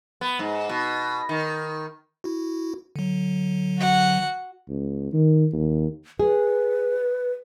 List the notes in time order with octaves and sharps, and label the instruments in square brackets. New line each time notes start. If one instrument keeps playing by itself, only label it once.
[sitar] B3
G#2
B2
D#3
[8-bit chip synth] E4 F#4
D3 F#3
[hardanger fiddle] F#4 F#5
[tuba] C#2
D#3
D#2
[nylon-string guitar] G#4 [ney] B4